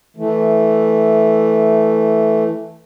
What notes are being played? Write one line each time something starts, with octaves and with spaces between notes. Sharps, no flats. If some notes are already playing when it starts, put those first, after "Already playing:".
E3 A3